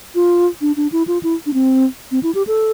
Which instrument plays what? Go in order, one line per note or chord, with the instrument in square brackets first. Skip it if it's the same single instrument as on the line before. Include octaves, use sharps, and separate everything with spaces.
[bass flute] F4
D4
D4
E4
F4
E4
D4
C4
C4
E4
G4
A4